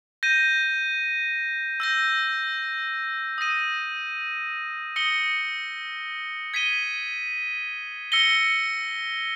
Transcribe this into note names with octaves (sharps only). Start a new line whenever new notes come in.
G6 A#6 D#7
E6 G6 A#6
D#6 A#6 D#7
D#6 A#6 C#7 G7
G#6 B6 D#7 G7
E6 A#6 C#7 G7